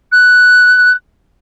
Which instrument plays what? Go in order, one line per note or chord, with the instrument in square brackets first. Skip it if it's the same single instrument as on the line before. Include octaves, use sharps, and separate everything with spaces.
[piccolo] F#6